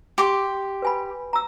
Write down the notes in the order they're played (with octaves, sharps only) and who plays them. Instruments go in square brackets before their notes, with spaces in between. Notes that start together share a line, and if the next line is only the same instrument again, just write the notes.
[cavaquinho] G4 C6 D6
[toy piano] B4 G#5 B5
A#5 E6